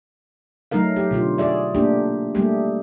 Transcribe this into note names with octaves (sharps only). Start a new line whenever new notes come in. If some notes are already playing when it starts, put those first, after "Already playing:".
F#3 A3 D#4 A#4 F5
G4
B2 D3 F4
F#4 G#4 D5 E5
A3 A#3 D4 G4
G3 A3 A#3 G4 G#4